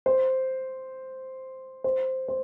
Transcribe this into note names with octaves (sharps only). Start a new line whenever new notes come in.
C5
C5
C5